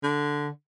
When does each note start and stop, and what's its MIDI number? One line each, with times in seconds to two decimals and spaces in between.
0.03 0.49 50